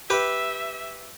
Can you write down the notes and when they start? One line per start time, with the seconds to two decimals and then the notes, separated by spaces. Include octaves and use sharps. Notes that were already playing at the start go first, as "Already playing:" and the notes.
0.10 G4 B4 E5